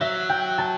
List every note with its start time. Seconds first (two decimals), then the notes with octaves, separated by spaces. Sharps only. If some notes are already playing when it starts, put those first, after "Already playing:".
0.01 F#3 E5
0.29 G5
0.58 A5